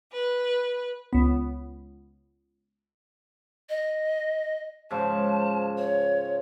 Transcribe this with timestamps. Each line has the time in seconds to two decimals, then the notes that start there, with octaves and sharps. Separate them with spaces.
0.13 B4
1.13 C#2 B3
3.70 D#5
4.91 G#2 C#3 F3 A5
5.78 C#5